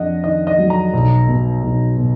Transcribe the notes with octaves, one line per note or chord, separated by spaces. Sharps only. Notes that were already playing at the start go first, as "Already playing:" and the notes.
Already playing: F2 D4 D#5 F#5
D#3 D#5
D#5
F#3
A#5
B1
B2
B1
B2